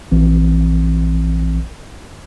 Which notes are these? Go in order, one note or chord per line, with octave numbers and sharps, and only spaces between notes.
A#1 E3 C4